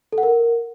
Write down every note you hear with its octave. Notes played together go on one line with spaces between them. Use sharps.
A4
F#5
A#4